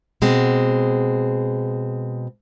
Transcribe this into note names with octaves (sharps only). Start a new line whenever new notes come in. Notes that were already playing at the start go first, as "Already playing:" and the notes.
B2 G#3 C4